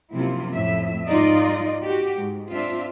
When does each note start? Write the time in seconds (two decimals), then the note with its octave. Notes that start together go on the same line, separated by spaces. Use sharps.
0.13 F#2 C3 F3 A#3 E4 F4
0.55 F2 A2 E5
1.09 G#2 G3 D#4 F4 D5 D#5
1.85 F#4 G4
2.17 G#2
2.52 C4 D4 F4 E5